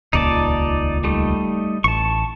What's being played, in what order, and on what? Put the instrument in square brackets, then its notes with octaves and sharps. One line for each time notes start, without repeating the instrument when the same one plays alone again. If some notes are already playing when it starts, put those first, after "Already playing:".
[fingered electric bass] D#1 C#2 A#2 [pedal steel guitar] D#4 D5 A5
[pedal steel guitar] G3 A3 D#4
[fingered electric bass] A1 [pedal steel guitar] A5 C#6